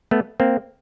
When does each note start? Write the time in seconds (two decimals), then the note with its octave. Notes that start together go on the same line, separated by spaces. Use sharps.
0.11 A3 B3
0.40 A#3 C4